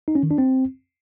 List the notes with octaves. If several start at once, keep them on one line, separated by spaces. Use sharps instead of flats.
D#4
C#4
D#3
D4
C4